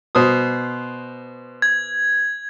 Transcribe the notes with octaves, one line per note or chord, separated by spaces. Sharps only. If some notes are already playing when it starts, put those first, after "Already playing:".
B2 C5 D#6
G#6